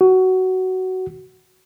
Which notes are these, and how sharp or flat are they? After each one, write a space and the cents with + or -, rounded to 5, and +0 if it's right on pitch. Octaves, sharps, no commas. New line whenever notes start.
F#4 +15